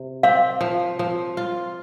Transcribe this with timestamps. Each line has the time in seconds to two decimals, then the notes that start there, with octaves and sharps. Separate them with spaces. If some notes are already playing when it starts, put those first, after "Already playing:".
Already playing: C3
0.23 C4 F5
0.61 F3
0.99 F3
1.37 F4